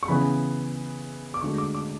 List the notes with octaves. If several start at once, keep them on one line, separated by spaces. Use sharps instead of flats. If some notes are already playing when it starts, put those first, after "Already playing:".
C#6
C#3 E3 B3 B5
D6
D2 D3 G#3 C#6
D6
D6